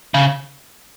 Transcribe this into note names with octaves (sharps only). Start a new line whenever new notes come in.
C#3